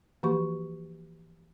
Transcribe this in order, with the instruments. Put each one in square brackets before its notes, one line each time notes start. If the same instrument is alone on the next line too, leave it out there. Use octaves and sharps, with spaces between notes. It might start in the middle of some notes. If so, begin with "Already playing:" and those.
[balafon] E3 F3 A#3 F#4 G4 C#6